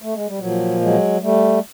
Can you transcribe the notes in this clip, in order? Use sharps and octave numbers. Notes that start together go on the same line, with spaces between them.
A3
G#3
G3
A#2 F3 F#3
F#3 G#3
G3 A3